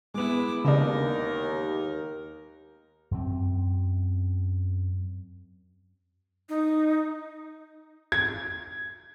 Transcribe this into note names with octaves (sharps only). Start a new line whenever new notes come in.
G#3 B3 E4 D6
D#2 C#3 D4 D#4 A#4
F#2 C4
D#4
G#6